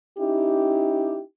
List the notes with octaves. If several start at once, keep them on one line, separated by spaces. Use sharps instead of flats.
C#4 D#4 E4 G4